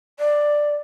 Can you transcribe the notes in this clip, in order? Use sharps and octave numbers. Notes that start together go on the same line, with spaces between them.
D5